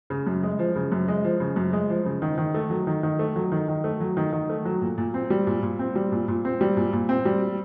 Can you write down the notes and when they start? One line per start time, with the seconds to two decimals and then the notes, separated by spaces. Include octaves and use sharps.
0.10 C#3
0.27 F#2
0.43 G#3
0.59 F3
0.76 C#3
0.92 F#2
1.08 G#3
1.24 F3
1.40 C#3
1.56 F#2
1.73 G#3
1.89 F3
2.05 C#3
2.22 D#3
2.38 D#3
2.54 A3
2.70 F#3
2.87 D#3
3.03 D#3
3.19 A3
3.36 F#3
3.52 D#3
3.69 D#3
3.84 A3
4.01 F#3
4.17 D#3
4.33 D#3
4.50 A3
4.65 F#3
4.82 A#2
4.98 A#2
5.14 C4
5.30 G3
5.47 A#2
5.63 A#2
5.79 C4
5.95 G3
6.12 A#2
6.28 A#2
6.45 C4
6.61 G3
6.77 A#2
6.93 A#2
7.09 C4
7.25 G3